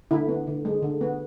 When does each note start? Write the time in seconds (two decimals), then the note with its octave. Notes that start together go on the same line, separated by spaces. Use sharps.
0.11 D3 E4
0.29 B3
0.47 D3
0.65 G#3
0.82 D3
1.01 B3